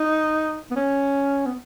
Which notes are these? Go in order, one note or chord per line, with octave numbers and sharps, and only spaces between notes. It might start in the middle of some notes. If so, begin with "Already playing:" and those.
Already playing: D#4
B3
C#4
B3